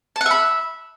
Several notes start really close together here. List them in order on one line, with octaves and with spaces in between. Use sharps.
A5 F#5 E5 B5